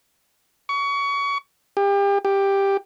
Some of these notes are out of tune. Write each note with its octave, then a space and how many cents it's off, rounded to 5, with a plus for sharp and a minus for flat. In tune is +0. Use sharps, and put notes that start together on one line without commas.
C#6 +30
G4 +35
G4 +10